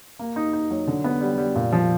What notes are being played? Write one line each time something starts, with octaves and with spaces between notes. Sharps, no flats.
A#3
D#4
D#4
F#3
D3
B3
G3
G3
A#2
F3